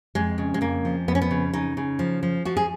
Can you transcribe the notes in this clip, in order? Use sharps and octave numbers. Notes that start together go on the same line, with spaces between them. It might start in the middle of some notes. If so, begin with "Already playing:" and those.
F2 G#3
C#3
G#3
F2 A#3
F3
F2 B3
C#4
B3
C#3
C#3 D#4
C#3
F3
F3
F3 F#4
G#4